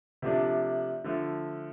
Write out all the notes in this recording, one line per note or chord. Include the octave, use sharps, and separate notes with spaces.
C3 F3 A3 D4
D3 F3 A3